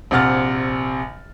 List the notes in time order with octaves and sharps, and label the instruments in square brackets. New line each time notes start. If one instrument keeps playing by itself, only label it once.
[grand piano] A#1 C3 F#5 F6 A6